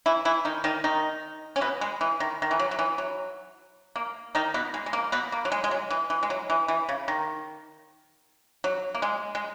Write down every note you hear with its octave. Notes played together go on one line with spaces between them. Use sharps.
E3 E4
E3 E4
D#3 D#4
D#3 D#4
D#3 D#4
C#4
B2 B3
G#3
E3
D#3
D#3
E3
F#3
F#3
E3
F#3
A#3
D#3 D#4
B2 B3
G#3
G#3
A#3
B2 B3
A#3
F#3
G#3
G#3
F#3
E3
E3
G#3
F#3
E3
E3
C#3
D#3
F#3
A#3
G#3
G#3